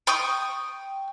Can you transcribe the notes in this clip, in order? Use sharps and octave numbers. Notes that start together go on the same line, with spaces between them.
G5 C#6 D#6